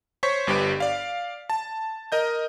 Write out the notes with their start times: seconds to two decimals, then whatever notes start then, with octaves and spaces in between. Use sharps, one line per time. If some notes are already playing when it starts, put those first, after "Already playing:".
0.23 C5 C#5 C#6 B6
0.47 G1 G2 G4 B4 D7
0.80 D5 F5
1.50 A5
2.12 A#4 D#5 G6